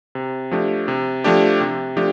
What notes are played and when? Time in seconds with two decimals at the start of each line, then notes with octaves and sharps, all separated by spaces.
0.15 C3
0.51 F3 A3 D4 G4
0.88 C3
1.24 F3 A3 D4 G4
1.61 C3
1.97 F3 A3 D4 G4